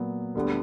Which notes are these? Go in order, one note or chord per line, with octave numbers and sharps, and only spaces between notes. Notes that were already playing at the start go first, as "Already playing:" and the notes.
Already playing: A#2 F#3 B3
D2 D3 G3 B3